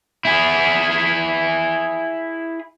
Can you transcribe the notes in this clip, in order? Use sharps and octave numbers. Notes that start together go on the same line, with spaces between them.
E4 G#4